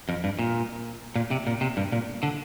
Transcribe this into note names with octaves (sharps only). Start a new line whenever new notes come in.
F2
G2
A#2
A#2
C3
A#2
C3
G2
A#2
D3